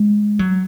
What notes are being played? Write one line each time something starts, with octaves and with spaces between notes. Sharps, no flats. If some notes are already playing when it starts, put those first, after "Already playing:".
Already playing: G#3
F#3